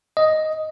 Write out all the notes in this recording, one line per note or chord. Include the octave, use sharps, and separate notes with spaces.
D#5